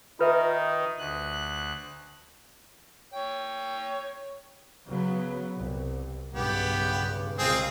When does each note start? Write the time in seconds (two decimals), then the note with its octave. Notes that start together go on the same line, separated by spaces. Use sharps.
0.19 D#3 D#4 F4 B4 E5
0.99 D2 F#6
3.14 C#5 G5
4.87 C#3 F#3 B3
5.56 C2
6.34 B1 G2 C#3 B3 G4
7.38 C2 C#3 G#3 C4 F4 G#4